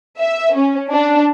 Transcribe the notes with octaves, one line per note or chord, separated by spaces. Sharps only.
E5
C#4
D4